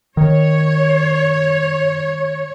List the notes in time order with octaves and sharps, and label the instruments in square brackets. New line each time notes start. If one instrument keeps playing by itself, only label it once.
[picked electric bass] D#3 [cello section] C#5